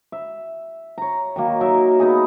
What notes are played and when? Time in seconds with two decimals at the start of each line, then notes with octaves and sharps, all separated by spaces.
0.12 E5
0.98 C#5 A#5
1.36 D#3 F#3 A#3
1.60 F#3 D#4 A#4 E5
2.00 B3 D#4 G#4